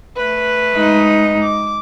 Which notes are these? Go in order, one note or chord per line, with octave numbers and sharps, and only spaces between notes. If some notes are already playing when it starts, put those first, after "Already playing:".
A3 B4
G#3 D#4
D6